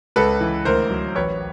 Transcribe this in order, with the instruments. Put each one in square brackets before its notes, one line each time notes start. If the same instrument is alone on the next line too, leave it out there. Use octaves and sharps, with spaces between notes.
[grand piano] C#2 A4 B4
E3
D2 A#4 C5
F#3
A1 B4 C#5